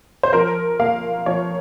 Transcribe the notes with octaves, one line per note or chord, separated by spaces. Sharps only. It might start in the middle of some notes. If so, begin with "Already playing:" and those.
C5
F3 A#4
A#3 F5
F3 C#5